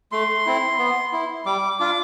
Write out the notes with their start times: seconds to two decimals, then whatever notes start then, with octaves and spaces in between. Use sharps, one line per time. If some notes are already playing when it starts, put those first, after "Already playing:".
0.12 A3 C6
0.46 C4 E4
0.79 B3
1.13 E4
1.45 G3 D6
1.80 D4 F4 D6